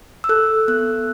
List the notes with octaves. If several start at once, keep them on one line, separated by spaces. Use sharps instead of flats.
E6
A4 F#6
B3 F#6